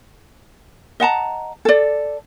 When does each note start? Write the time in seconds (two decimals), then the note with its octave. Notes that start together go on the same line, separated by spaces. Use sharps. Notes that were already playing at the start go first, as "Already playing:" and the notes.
1.00 D#5 F#5 A5 A#5
1.65 A4 D5